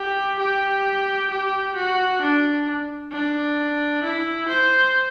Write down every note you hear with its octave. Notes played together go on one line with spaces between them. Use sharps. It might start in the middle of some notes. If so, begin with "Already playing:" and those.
Already playing: G4
G4
G4
F#4
D4
D4
E4
C5